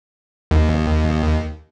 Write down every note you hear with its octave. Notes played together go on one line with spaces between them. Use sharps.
D#2